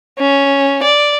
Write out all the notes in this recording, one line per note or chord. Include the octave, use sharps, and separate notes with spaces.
C#4
D5